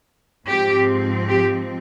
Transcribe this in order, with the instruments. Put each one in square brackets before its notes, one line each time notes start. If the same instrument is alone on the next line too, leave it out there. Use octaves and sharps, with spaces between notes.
[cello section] G#2 F3 C4 G4
G4